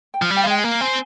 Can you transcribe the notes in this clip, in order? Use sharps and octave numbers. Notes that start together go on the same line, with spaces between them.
G5
F3
G3
G5
F5
G#3 G5
G#5
A#3
C4 G#5